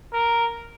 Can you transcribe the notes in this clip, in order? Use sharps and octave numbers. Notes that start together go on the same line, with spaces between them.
A#4